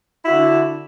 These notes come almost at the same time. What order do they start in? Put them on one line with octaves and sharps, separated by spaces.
E4 F#4 D3